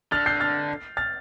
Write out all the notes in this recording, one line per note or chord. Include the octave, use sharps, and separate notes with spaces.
D3 F6 A6
G6 C7
F6 A6
F6 A6